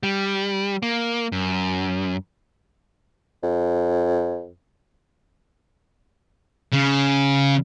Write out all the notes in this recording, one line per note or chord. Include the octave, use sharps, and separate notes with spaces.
G3
A#3
F#2
F2
C#3